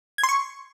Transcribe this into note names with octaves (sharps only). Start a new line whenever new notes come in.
G#6
C6
C#6